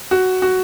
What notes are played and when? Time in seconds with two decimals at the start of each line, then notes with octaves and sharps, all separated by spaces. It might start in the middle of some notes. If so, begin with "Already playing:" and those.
0.11 F#4
0.42 F#4